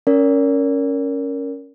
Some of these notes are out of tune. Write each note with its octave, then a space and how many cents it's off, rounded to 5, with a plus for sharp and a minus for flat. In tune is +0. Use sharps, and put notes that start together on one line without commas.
C#4 +0 A#4 -5 D5 -45